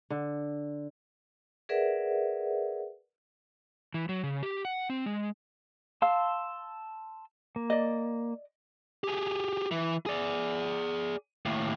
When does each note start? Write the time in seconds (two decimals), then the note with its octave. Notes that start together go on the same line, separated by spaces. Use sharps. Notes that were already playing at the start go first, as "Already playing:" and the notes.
0.10 D3
1.69 G#4 A#4 B4 D5 E5 F#5
3.94 E3
4.09 F#3
4.24 C#3
4.43 G4
4.65 F#5
4.90 C4
5.06 G#3
6.02 F5 A5 C6 E6
7.56 A#3
7.70 D5 D#5
9.04 G4 G#4
9.72 E3
10.06 G#4 D5
11.46 D#2 A2